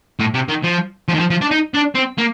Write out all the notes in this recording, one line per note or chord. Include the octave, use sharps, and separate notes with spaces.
A2
C3
D#3
F3
F3
D#3
F3
F3
D4
D#4
D4
C4
A#3